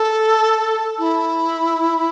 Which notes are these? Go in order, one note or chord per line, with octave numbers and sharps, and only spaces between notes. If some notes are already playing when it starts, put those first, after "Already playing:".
Already playing: A4
E4